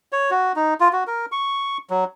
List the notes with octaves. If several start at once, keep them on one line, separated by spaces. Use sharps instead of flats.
C#5
F#4
D#4
F4
F#4
A#4
C#6
F#3